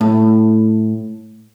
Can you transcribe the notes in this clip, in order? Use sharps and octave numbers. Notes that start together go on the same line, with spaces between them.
A2